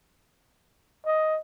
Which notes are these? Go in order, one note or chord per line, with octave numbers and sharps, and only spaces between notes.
D#5